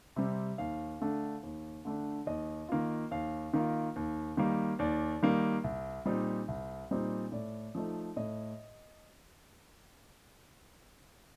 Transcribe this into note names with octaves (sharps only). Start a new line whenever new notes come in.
C3 G3 C4
D#2 F5
D3 A3 D4
D#2
D3 A3 D4
D#2 D#5
D#3 A#3 F4
D#2 F5
D#3 A#3 F4
D#2
D#3 G3 A#3
D#2 D5
D#3 G3 A#3
C2
A#2 G3 C4 D#4
C2
A#2 G3 C4 D#4
A2 D5
F3 A3 D#4
A2 D#5